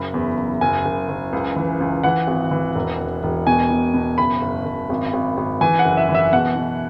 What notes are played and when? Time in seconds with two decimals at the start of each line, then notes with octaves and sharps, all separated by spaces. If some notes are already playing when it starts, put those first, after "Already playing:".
Already playing: F#1 B5
0.14 E2
0.37 F#1
0.61 F#1 G#5
0.85 F#1
1.09 F#1
1.33 C#2
1.56 E3
1.80 C#2
2.03 E3 F#5
2.27 G#1
2.51 E3
2.75 E1
3.00 E1
3.23 E1
3.47 B2 G#5
3.71 B2
3.94 B2
4.18 F#1 B5
4.42 F#1
4.65 F#1
4.90 G#1
5.13 G#1
5.37 G#1
5.61 E3 G#5
5.79 F#5
5.85 F#1
5.97 E5
6.09 E3
6.15 E5
6.32 B2 F#5
6.56 B2